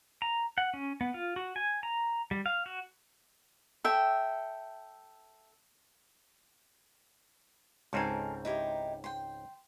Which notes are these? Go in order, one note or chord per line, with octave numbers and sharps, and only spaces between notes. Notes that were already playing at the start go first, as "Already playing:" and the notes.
A#5
F#5
C#4
B3
F4
F#4
G#5
A#5
G3
F5
F#4
A4 E5 G5
C#2 G#2 C4 A4 A#4 G#5
D#4 E4 G4
G5 C6